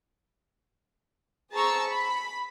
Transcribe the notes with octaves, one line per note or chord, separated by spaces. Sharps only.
G#4 C5 A5 A#5 C#6 E6
B5